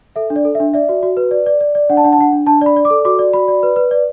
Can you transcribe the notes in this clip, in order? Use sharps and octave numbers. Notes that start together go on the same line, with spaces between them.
A4 E5
D4
D5
A4
E5
D4
D5 E5
F#4
F#4
B4
D5
D5
D5
D5
D4 F#5
A5
D4 F#5
A5
D4 F#5
D4
D4 A5
D5 B5
D5
D6
A4
F#4 D6
D5
F#4 B5
D5
B4
B4
D5